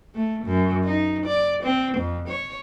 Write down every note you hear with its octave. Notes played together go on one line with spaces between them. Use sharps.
A3
F#2
D#4
D5
C4
F2
C#5